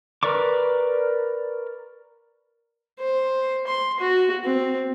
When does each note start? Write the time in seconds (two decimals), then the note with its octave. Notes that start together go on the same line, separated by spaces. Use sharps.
0.23 A#4 B4 D5 C#6 D6
2.99 C5
3.67 C6
4.00 F#4
4.44 C4